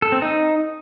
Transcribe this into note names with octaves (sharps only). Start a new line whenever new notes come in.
A4
C4
D#4